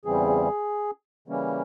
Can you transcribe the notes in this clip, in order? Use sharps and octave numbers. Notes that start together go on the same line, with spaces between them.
E2 C#3 E3 G3 C4 G#4
C#3 E3 G3 A#3 C#4